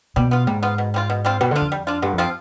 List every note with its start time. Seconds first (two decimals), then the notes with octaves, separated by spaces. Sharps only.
0.16 B2 G3
0.31 B3 F4
0.47 G#2 G3
0.63 B3 F4
0.78 B2
0.94 G3 C4 F4
1.10 B2
1.25 G3 C4 F4
1.40 B2 G3
1.51 D3 D4 F4
1.61 F2
1.72 G3
1.87 D4 F4
2.02 G2 D3
2.13 F2
2.18 F3 C4 F4